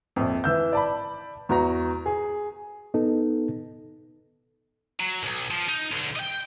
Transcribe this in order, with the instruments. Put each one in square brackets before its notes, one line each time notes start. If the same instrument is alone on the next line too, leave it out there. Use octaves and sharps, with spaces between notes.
[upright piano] A#1 F2
E3 E6 G6
D5 A5 B5
E2 F#4 A#5
G#4
[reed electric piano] B3 D#4 A4
[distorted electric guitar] F#3
B1 F#2
F3
D#4
B1 D3
D#5 G5